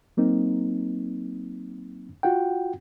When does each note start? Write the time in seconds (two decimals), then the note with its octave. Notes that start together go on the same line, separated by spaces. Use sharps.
0.17 F#3 A#3 C4 D#4
2.23 F4 F#4 F#5 G5